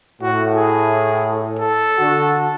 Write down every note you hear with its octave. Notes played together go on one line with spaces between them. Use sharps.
A2 F#4
G#4
A4
D3 F#4